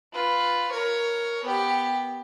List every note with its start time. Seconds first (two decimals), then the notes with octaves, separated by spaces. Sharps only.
0.13 F4 B4
0.72 A#4 C#5
1.44 B3 G4